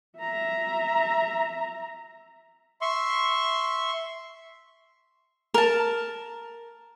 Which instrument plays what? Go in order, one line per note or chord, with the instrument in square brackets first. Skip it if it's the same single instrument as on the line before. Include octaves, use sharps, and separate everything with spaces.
[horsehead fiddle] E5 A#5
[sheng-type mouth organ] E5 C6 C#6
[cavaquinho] A#4 A5